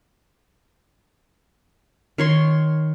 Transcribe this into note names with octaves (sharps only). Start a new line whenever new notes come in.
D#3 C#5 C6